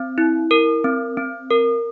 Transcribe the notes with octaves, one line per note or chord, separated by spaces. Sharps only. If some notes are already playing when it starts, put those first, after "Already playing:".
Already playing: C4
E4
A#4
C4
C4
A#4